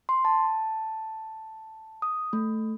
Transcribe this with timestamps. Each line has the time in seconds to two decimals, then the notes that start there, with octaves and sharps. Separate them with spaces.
0.09 C6
0.25 A5
2.02 D#6
2.33 A3